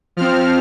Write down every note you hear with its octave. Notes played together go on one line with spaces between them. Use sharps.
F3 C4 F6